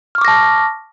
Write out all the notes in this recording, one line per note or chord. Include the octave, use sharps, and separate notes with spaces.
A5 C#6 D6 F6 A#6